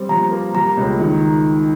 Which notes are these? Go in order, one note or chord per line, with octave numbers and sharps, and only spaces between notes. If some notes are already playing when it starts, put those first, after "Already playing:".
Already playing: G3 C4
F3 A#5
A#3
G3 A#5
C#2
D#3